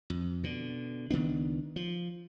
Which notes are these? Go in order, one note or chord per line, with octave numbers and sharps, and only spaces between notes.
F2
B2 D3
C#2 D#3 B3 D4
F3